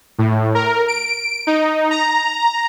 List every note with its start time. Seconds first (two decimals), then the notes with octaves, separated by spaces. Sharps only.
0.19 A2
0.55 A#4
0.88 D7
1.47 D#4
1.91 A#5